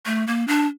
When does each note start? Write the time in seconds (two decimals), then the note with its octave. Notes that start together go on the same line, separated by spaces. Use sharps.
0.06 A3
0.27 A#3
0.48 D4